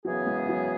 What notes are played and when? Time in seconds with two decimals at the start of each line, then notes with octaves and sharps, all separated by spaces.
0.05 F#2 C#3 E3 F#3 B3 G#4
0.26 G#3
0.49 F#3